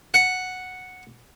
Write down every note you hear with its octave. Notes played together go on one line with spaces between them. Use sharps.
F#5